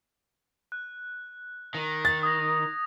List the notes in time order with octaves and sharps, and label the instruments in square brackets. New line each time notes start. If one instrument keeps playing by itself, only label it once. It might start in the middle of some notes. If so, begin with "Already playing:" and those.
[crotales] F#6
[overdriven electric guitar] D#3
[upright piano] A6
[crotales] D#6 G#6 A#6